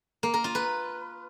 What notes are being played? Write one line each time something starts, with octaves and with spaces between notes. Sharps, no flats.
A#3
A#4
F4
B4